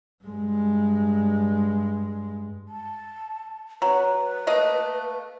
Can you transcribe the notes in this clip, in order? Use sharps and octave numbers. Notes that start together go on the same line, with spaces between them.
G2 G#3
A5
F#3 B4 A#5
A3 A#3 D#5